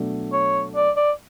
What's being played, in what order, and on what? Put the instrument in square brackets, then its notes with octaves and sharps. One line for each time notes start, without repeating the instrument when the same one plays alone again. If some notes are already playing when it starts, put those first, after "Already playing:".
Already playing: [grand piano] B2 F#3 A3 D4
[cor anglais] C#5
D5
D5